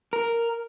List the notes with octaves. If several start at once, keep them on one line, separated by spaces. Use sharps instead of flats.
A#4